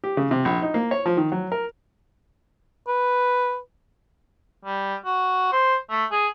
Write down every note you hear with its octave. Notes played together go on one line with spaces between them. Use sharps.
G4
C#3
C3
A#1
D#4
A#3
C#5
F3
D#3
F#3
A#4
B4
G3
F#4
C5
A3
G#4